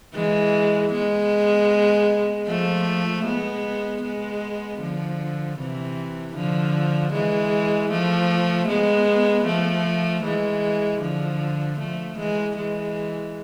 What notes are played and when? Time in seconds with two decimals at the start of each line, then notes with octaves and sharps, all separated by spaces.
0.14 E3 G#3
0.92 G#3 B3
2.47 F3 A3
3.25 G#3 B3
4.03 G#3 B3
4.81 D3 F3
5.59 C3 E3
6.36 D3 F3
7.13 E3 G#3
7.91 F3 A3
8.68 G#3 B3
9.46 F3 A3
10.23 E3 G#3
11.01 D3 F3
11.79 F3 A3
12.18 E3 G#3
12.56 E3 G#3